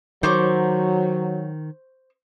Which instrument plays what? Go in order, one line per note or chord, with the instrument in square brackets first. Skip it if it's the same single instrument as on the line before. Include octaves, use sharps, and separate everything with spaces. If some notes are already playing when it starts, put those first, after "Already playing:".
[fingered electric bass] D#3 [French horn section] F#3 [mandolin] C5 C#6 D6